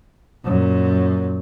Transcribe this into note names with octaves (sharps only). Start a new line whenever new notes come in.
F#2 A#2